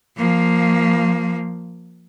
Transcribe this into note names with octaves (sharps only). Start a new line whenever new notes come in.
F3 A#3